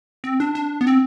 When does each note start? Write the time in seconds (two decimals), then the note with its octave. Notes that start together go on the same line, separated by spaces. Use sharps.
0.24 C4
0.40 D4
0.55 D4
0.81 B3
0.87 C4